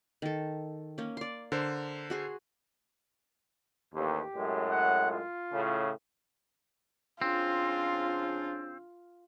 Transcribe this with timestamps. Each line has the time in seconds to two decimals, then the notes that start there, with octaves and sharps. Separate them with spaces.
0.22 D#3 A4
0.98 A#3 C#4
1.17 D5 C6
1.52 D3 A#4 C5
2.10 F#4 G#4 C6
3.94 A1 D#2 G4
4.36 F#2 A2 G#3
4.71 F#5
5.11 F4
5.52 A2 C#3
7.22 C#3 F3 C4 D4 F4